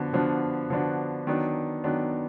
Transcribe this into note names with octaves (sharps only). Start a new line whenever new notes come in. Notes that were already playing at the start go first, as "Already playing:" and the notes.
Already playing: D3 F3 B3 D4 F#4
D3 F3 B3 D4 F#4
D3 F3 B3 D4 F#4
D#3 F#3 B3 D4
D#3 F#3 B3 D4